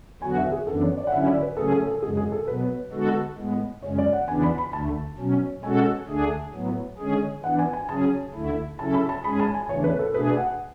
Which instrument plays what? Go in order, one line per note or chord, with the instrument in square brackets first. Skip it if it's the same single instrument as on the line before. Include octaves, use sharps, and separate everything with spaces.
[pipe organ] E2 D3 F#3 B3 F#4 [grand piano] G#5
[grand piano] E5
G#4
[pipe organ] F#2 E3 B3 D4 [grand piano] A4
[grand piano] C#5
D5
F#5
[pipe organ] D3 F#3 C#4 E4 [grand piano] E5
[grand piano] D5
B4
[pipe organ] C#3 F#3 A3 C#4 G#4 [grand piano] A4
[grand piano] A4
A4
[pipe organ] F#2 C#3 G#3 [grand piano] G#4
[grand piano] G#4
A4
[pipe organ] B2 F#3 B3 [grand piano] B4
[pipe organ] D3 G#3 B3 F#4 A4
A2 G#3 B3
[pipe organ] F#2 C#3 G#3 C#4 [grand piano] C#5
[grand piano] D5
F#5
[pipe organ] E2 C#3 E3 B3 D4 [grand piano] G#5
[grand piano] B5
B5
[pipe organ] D2 D3 A3 [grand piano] A5
[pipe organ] B2 F#3 C#4
[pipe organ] B2 G#3 C#4 F#4 A4 [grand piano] G#5
[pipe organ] D2 D3 A3 D4 G#4
A2 F#3 B3
D3 G#3 C#4 G#4
[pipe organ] E3 B3 D4 [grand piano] F#5
[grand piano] G#5
G#5
[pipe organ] C#3 F#3 C#4 G#4 [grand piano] A5
[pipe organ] D2 D3 A3 E4
[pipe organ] C#3 F#3 C#4 E4 A4 [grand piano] A5
[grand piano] B5
A5
[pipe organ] G#2 G#3 C#4 G#4 [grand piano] B5
[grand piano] A5
G#5
[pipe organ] E2 C#3 E3 A3 D4 [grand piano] C#5
[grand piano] B4
A4
[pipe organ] B2 A3 D4 G#4 [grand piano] B4
[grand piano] F#5